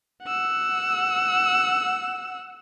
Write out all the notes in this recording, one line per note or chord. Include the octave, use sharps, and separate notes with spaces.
F#5 E6